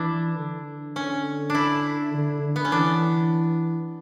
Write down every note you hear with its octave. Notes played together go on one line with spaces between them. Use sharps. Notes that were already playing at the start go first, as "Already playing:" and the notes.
Already playing: E3 D4 E4
D3
C#4
D4 E4
D3
D3
B3
C#4
E3 D4